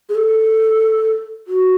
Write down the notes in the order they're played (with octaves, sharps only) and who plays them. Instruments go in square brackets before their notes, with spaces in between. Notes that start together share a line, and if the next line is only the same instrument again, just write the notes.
[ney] G#4
A4
F#4